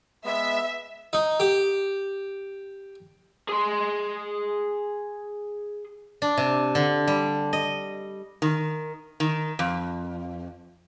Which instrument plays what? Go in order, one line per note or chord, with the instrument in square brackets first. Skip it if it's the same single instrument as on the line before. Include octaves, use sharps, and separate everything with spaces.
[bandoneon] G#3 B3 [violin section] E5
[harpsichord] D#4
G4
[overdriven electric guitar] G#4 C6
[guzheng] D4
C3
D3
G3
D#5
[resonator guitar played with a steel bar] D#3
D#3
F2